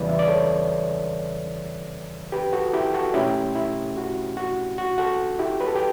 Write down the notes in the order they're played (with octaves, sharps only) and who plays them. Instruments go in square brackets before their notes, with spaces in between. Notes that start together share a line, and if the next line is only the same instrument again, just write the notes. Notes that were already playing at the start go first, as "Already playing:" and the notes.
Already playing: [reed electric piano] E2 C#3 E3 G3 B4 D5
E5
D5
A4 C#5
G4 B4
F#4 A4
E4 G4
F#4 A4
B2 A3 C#4 E4 G4
E4
F#4
F#4
F#4
F#4 A4
E4 G4
B4
A4
G4